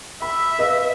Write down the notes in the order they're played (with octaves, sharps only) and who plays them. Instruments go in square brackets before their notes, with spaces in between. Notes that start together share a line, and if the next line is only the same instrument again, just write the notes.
[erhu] E5 [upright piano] B5
[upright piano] B4 D#5 F5